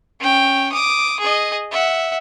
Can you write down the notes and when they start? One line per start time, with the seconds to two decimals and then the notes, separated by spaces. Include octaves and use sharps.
0.20 C#4 G5
0.73 D6 D#6
1.20 G#4 D#5
1.71 E5 F#5